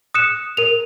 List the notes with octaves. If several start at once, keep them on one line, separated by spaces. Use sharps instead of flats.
D#6 F#6 C#7 E7
A#4 F7